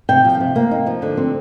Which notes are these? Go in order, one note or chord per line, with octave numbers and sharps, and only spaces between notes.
C3 G5
F3
C3
A#3
D#4
F3
D3
C4